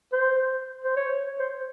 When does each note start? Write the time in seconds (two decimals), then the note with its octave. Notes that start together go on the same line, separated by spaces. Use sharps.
0.13 C5
0.85 C5
0.97 C#5
1.40 C5